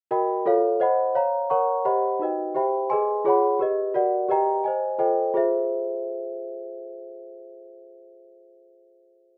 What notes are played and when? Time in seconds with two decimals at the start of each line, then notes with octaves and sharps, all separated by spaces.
0.11 F#4 A#4 D#5 G5 B5
0.46 F4 A4 C#5 F5
0.80 C5 D#5 F#5 B5
1.15 C#5 F5 A#5
1.50 A#4 C#5 F#5 A#5 C#6
1.85 G4 C5 D#5 F#5 B5
2.19 D#4 F#4 B4 D#5 G5
2.55 G4 C5 E5 G5 B5
2.90 G#4 B4 D#5 G#5 C6
3.25 F4 G#4 C#5 F#5 B5
3.59 G4 B4 D#5
3.94 F#4 A#4 D5 F#5
4.29 G4 B4 D#5 G5 A#5
4.64 C5 D#5 G#5
4.99 F4 A4 C5 D#5 G5
5.34 F4 G#4 C5 E5